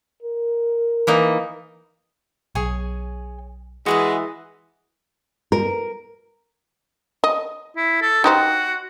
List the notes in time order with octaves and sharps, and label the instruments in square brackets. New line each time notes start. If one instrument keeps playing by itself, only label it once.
[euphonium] A#4
[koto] E3 A#3 D#4
[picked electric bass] B1 [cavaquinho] G#4 C#5 G#5
[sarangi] E3 [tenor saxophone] G#3 [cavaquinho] F#4 G#4 D#5
[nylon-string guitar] A#4
[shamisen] D#5
[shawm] E4
A4
[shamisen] D#4 G4 C5 [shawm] F#4